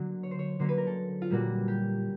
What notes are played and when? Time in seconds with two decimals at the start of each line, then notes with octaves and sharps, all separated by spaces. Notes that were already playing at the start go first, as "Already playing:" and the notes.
Already playing: D3 F#3 A#3
0.23 C#5
0.31 C5
0.39 C#5
0.59 D3 F#3 A#3 C#4 C5
0.69 B4
0.78 A#4
0.87 A4
1.22 F4
1.30 A#2 G3 A#3 F#4
1.68 G4